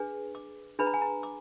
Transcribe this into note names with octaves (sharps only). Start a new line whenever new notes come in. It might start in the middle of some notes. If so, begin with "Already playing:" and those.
Already playing: D4 G#4 B4
D6
D4 G#4 B4 B5
A#5
G#5
A#5
D6